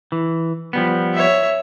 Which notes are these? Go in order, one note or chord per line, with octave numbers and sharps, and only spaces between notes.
E3
F3 G3 B3
C#5 E5